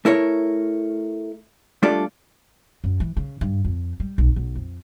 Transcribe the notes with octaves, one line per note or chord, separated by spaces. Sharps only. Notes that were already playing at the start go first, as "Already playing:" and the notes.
A3 E4 A#4 C#5
G3 A3 D4 F4 A4 D5
F#2
E3
C#3
G2
F2
G3
B1
B1
F2